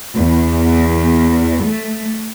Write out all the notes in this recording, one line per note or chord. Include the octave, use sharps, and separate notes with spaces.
E2
A3